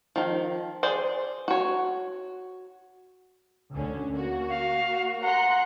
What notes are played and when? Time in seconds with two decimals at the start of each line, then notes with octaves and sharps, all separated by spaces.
0.16 D#3 F3
0.83 G#4 C5 D5
1.48 F#4 C#5
3.75 D2 D3 C#4
4.15 A#3 F#4
4.50 F5
5.23 F#5 A#5 C6 F#6